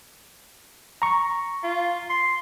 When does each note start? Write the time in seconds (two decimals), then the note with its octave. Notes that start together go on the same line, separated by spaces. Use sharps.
1.02 A#5 C#6
1.63 F4
2.10 C6